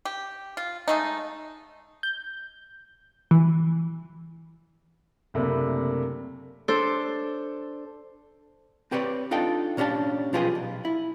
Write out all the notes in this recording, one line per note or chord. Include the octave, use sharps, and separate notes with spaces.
G4
F4
G#3 A3 D#4
G6
E3
F#1 C3 A3 A#3 D4 B5
D4 A4 C5
C4 G4 B4 C#5 D5
D4 D#4 F4 A4 G5
A#2 C#4 D4 G4 A5
B1 F3 F4 G4 G#4 B4
B1
E4